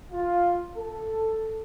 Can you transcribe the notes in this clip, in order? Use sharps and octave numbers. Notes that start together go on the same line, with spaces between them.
F4
A4